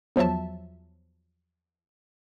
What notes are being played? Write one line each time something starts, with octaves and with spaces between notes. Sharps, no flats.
E2 F3 F#3 E5 A5